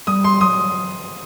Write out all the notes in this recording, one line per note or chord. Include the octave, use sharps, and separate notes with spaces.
G3 D#6
C6
F#3 D#6